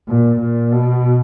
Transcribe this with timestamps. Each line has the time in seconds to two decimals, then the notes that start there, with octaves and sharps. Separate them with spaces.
0.08 A#2
0.40 A#2
0.72 B2